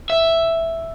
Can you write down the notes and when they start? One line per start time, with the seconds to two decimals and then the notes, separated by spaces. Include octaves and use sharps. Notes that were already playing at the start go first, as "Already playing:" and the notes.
0.10 E5